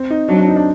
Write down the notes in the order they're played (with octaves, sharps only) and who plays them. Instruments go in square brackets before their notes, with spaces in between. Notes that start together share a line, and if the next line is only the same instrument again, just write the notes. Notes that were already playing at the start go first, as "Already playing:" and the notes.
Already playing: [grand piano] C4
D#4
[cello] F#3 [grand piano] D4
[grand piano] D4
D#4
D4